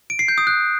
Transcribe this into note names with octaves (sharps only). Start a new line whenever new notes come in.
D7
C7
G6
D#6
F#6